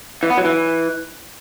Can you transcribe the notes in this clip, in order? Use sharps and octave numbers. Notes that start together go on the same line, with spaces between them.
E3
B3
F#3
E3